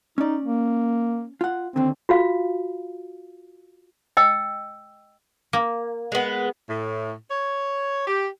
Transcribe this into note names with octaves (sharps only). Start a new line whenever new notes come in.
C#4 D#4 D5
A#3
F4 F#5
D#2 D3 C4
F4 F#4 F5
D#5 G5 E6
A#3
G#3 B3
A2
C#5
G4